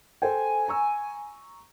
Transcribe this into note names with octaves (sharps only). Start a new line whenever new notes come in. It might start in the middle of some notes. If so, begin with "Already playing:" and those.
A4 C5 G5 G#5
A#5 C#6 E6